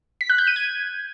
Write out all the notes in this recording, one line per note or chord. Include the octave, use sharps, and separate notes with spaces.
B6
F#6
G6
D#7
G#6